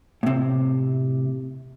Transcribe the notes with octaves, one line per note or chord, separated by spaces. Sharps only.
A2 C3